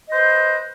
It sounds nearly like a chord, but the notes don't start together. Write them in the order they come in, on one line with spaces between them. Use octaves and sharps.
D#5 C5 B4